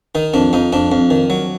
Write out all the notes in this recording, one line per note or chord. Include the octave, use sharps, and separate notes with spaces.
D#3 D#4
F2 D4
F2 D#4
F2 D4
F2
D#3
F#3